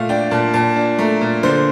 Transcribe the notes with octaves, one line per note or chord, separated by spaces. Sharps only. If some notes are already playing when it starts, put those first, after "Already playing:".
Already playing: A#2 A3 F5
D4 G5
A#2 A5
A#2 A5
D4
A3 A#5
A#2
D3 C5